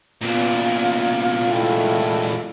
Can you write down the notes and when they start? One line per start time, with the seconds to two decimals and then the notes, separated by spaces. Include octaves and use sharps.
0.22 E2 A#2 B3 F4
1.48 G#3 A3 E4 G5